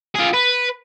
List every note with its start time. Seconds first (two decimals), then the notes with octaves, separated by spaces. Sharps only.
0.15 F4 G#4
0.34 B4